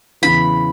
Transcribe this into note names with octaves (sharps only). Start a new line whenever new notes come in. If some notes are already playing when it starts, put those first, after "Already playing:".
E2 C#3 E3 B5